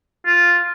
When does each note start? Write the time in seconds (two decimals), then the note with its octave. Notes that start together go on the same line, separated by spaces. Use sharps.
0.26 F4